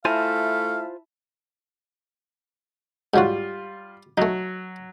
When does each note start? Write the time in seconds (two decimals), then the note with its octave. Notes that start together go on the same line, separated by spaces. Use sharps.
0.05 A3 E4 F4 C5 E5 F5 G#5 A5
3.14 G#2 F#3 G3 F4 F#4
4.18 F#3 A3 D#4